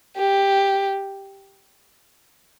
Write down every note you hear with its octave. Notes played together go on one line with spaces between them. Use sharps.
G4